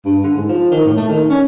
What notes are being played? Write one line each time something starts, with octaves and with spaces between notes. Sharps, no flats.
G2
D3
G#2
F3
D#3
A2
A3
D#3
C#4